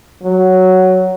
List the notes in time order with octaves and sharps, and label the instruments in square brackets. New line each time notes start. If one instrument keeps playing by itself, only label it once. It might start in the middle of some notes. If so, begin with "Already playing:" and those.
[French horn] F#3